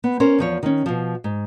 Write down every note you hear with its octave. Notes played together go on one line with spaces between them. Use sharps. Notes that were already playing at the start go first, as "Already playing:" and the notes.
B3
C#4 A#4 C5
E2 F3 C#5
D#3 C#4
B2 F3
G#2